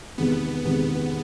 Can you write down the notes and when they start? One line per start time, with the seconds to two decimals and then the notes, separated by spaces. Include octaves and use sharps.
0.18 E2 C3 D#3 G#3 B3
0.65 E2 C3 D#3 G#3 B3